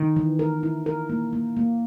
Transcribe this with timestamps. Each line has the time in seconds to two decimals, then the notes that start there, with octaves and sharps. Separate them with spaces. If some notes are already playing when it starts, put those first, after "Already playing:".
Already playing: D#3
0.16 E3
0.39 A#4
0.63 E4
0.86 A#4
1.09 A#3
1.33 A#3
1.57 A#3